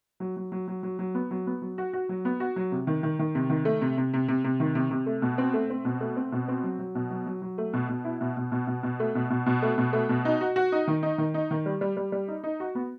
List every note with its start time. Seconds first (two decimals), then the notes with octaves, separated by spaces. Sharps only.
0.20 F#3
0.37 F#3
0.52 F#3
0.68 F#3
0.83 F#3
0.99 F#3
1.15 B3
1.31 F#3
1.47 B3
1.62 F#3
1.78 F#4
1.93 F#4
2.09 F#3
2.25 B3
2.40 F#4
2.56 F#3
2.72 C3
2.87 D#3
3.03 D#3
3.19 D#3
3.35 C3
3.50 D#3
3.65 A3
3.81 C3
3.97 C3
4.13 C3
4.28 C3
4.44 C3
4.60 D#3
4.75 C3
4.91 C3
5.06 A3
5.22 B2
5.38 C4
5.54 A3
5.70 C4
5.85 B2
6.00 A3
6.17 C4
6.32 B2
6.48 C4
6.63 F#3
6.79 F#3
6.95 B2
7.10 F#3
7.26 F#3
7.42 F#3
7.58 A3
7.73 B2
7.89 B2
8.05 E4
8.21 B2
8.37 B2
8.52 B2
8.67 B2
8.83 B2
9.00 A3
9.15 B2
9.30 B2
9.46 B2
9.62 A3
9.78 B2
9.93 A3
10.09 B2
10.25 D#4
10.41 F#4
10.56 F#4
10.72 D#4
10.87 D#3
11.03 D#4
11.18 D#3
11.34 D#4
11.51 D#3
11.66 G3
11.81 G3
11.97 G3
12.12 G3
12.28 D#4
12.44 D#4
12.60 F#4
12.75 B3